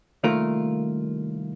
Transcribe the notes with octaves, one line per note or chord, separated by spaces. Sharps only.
C2 D#3 A3 A#3 F4 A#4